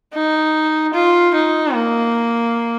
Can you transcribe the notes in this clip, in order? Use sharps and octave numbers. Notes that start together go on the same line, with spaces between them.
D#4
F4
D#4
A#3